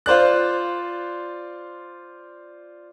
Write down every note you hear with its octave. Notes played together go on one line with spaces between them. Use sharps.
F4 C5 D5 F#6